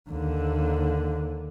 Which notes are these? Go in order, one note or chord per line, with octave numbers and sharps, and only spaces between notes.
D#2 D3